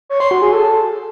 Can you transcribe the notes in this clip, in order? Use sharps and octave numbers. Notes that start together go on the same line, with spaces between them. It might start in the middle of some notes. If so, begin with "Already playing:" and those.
C#5
C6
F#4
G#4
A4